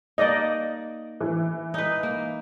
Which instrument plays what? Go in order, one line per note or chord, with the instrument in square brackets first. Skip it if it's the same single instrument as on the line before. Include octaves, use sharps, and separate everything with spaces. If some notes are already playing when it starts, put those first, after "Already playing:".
[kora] A#3 D#4 [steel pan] D5 D#5
[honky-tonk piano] E3
[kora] D#4 B4
A#3